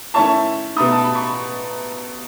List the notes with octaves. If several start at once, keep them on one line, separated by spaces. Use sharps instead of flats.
D#3 A3 C#4 E4 A5 C#6
B2 A3 D#4 B5 D#6
A5
B5
C#6